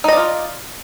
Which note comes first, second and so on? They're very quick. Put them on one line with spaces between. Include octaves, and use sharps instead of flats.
D#4 D#5 D5 F4